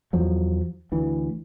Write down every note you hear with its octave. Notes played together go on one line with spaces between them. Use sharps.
E2 F3 F#3
D2 E3